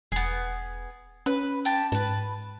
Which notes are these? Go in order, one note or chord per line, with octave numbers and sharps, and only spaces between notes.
E1 B3 G#4
C#4 B4
G4 A5
G#2 B4 A5